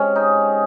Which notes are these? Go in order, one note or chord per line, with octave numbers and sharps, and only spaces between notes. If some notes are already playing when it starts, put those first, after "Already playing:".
Already playing: C3 G#3 C#4
D#4